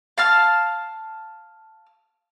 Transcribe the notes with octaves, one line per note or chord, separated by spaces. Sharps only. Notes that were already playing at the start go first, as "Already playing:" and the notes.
F5 A5 F6